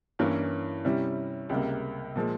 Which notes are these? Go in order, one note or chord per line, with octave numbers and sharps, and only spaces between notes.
G2 E3 A#3 C#4 E4
C3 G3 C#4 E4
C#2 C3 G3 A#3
A#2 F3 G#3